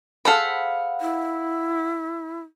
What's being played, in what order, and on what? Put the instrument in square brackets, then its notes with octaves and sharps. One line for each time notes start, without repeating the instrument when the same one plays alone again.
[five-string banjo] G#4 A4 C5 [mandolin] F5 F#5 B5
[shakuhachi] E4